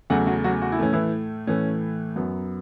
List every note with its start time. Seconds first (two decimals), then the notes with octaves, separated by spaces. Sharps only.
0.10 E2 C#3 F#3 A3 F#4 F#5
0.27 F#3 F#4
0.44 F#3 F#4
0.62 F#4
0.72 E4
0.79 A2 E3 A3 C#4
0.93 E3 E4
1.47 A2 E3 A3 C#4
2.16 F#2 F#3 B3